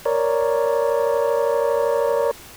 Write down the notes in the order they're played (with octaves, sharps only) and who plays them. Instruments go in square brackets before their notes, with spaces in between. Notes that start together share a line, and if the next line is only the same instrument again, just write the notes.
[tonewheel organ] A#4 C#5 D5